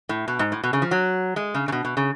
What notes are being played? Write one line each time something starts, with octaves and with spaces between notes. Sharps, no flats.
A2
B2
G#2
A2
B2
C#3
F3
F#3
G#3
C#3
C#3
B2
B2
C#3